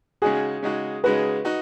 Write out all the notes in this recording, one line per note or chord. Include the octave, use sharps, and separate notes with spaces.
C#3 G#3 D#4 F#4 G#4
C#3 G#3 D#4 F#4
C#3 G#3 D#4 F#4 B4
D#4 F#4